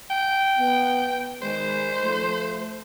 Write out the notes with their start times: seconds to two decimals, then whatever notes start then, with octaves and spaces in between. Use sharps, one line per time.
0.10 G5
0.59 B3
1.42 D#3 G#3 C5
2.02 F3 A3